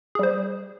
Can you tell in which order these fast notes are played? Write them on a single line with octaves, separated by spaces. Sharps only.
G#4 G3 C5